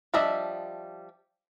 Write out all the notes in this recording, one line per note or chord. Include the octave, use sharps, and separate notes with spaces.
F3 G3 D4 D#5 E5